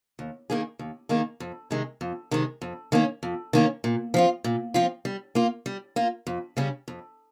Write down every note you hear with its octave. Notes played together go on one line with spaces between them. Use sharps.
D#2
D#3 A#3 D#4 G#4
D#2
D#3 A#3 D#4 G#4
F2
C3 D#3 G#3
F2
C3 D#3 G#3
F2
D#3 A#3 C#4
F2
D#3 A#3 C#4
A#2
F3 C4 F4
A#2
F3 C4 F4
G3
A#3 F4
G3
A#3 F4
F2
C#3 G3 C#4
F2